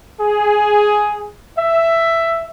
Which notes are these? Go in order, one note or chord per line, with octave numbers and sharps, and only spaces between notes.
G#4
E5